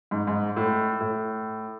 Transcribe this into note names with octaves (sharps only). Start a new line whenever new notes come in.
G#2
G#2
A2
A2